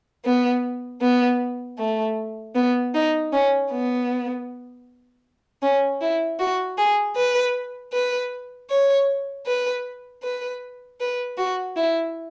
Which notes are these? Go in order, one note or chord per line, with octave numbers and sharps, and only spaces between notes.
B3
B3
A3
B3
D#4
C#4
B3
C#4
E4
F#4
G#4
B4
B4
C#5
B4
B4
B4
F#4
E4